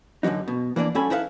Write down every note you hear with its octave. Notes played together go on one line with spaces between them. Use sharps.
F#2 D3 E3 F#3 D#4
B2
E3 A#3 D4 D5
G#2 F#3 C#4 A4 G#5 B5
D#4 E4 A4 B4 C#5 F5